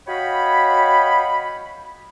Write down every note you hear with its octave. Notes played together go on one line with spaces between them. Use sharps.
F#4 C#5 D#5 F5 G5 B5